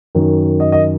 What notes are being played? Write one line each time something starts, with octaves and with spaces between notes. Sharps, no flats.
F#2 D#3
D#5
D#5